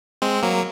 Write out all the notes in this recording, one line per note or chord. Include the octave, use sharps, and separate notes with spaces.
G#3 C4
F#3 A#3